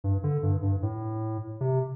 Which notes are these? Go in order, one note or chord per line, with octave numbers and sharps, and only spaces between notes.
G2
D3
G2
G2
A2
C3